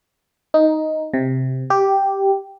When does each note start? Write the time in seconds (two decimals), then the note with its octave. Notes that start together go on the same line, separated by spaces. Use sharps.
0.54 D#4
1.14 C3
1.70 G4